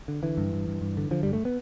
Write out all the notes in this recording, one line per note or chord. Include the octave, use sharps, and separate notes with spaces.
D3
D3 E3
G2
G2
G2
G2
D3
D3 F3
G2 G3
A3
B3